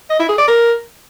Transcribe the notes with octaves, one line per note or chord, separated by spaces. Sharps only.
D#5
E4
G#4
D5
A#4